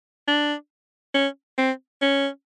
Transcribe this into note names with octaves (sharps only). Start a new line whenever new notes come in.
D4
C#4
C4
C#4